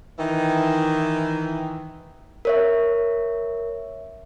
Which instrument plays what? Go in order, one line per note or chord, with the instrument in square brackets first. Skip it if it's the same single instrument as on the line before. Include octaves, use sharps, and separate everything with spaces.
[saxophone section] D#3 E3
[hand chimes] A#4 C#5 E5